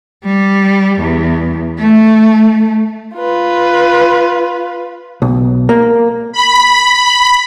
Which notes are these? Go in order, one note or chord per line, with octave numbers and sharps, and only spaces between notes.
G3
E2
A3
F4 B4
B1
A#3
B5